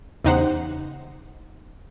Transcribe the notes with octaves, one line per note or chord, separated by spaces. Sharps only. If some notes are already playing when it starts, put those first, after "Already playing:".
E2 C#3 D#4 G4 C5 F#5